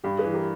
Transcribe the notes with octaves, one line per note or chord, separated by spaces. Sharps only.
G2 G4
G#4 B4
E3
G4 A#4